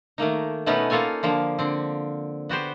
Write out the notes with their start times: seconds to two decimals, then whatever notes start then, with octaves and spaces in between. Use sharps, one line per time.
0.18 D#3 A3 A#3 D#4
0.66 B2 A3 B3 C#4 D#4 B4
0.90 A#3 F4 A4 C#5 G#5
1.23 D3 F3 A#3
1.59 D3 C4
2.49 B3 F#4 G4 C5